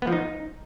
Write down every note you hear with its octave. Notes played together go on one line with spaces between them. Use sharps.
B3
F3
D#4